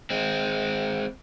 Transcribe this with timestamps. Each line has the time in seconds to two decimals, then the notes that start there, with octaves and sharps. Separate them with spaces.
0.10 G#3 C4